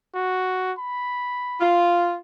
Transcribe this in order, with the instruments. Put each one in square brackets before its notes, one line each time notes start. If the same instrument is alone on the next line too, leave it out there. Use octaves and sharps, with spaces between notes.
[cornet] F#4
B5
[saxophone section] F4